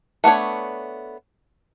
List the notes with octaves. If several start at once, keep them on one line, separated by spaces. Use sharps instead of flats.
A3 B3 D4 C#5